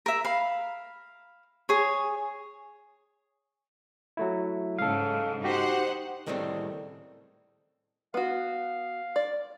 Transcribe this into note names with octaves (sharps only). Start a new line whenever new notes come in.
A#4 E5
F5 B5
G#4 C#5
F#3 A3 E4
G#2 C#3 A4 F5
D#4 F#4 G4 C5 F#5
C#2 A2 D#3 G3 A3 C4
B3 F#4 F5
D5